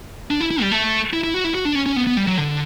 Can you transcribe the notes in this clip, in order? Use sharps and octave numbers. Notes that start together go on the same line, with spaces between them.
D4
E4
E4
G3
A3
E4
E4
F#4
E4
F#4
D4
C#4
C#4
B3
B3
G3
F#3
D3